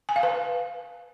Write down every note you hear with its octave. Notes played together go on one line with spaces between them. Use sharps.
G#5
F5
B4